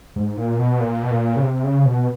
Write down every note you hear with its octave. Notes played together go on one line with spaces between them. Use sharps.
G#2
A#2
B2
A#2
B2
A#2
C#3
C3
C#3
B2